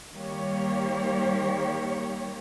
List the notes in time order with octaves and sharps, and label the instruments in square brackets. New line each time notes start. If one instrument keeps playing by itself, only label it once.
[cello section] D#3 G3 A#3 G4 C#5